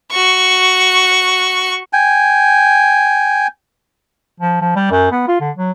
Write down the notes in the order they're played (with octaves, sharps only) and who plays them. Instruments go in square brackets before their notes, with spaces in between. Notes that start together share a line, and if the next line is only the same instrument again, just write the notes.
[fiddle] F#4 C#6
[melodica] G5 G#5
[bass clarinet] F3
F3
G3
F#2
B3
F4
D3
F#3